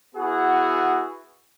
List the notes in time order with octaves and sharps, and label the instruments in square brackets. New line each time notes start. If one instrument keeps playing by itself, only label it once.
[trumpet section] B3 E4 F#4 G#4 F#5